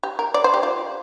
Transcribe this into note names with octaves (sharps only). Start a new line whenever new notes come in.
G4
A#4
D5
C5
G4
F4